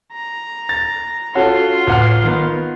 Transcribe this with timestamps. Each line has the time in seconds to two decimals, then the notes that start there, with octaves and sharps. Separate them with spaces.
0.13 A#5
0.69 A6
1.35 C#4 F4 F#4 A4 C6
1.87 A1 F#5 F6
2.24 D#3 B3